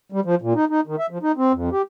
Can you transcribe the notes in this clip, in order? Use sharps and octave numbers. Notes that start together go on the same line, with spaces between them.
G3
F3
A#2
D#4
D#4
D#3
E5
F3
D#4
C4
F2
G4